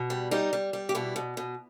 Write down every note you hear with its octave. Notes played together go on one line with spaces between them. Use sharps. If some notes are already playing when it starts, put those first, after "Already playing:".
Already playing: B2
G3
G3 D#4
G3
G3
G4
B2 E4
B2
B2